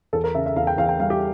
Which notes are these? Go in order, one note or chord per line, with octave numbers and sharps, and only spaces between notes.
E2 A4
A#4
C#3 E5
E5
E2 F5
G5
E2 F5
G5
G3 F5
G4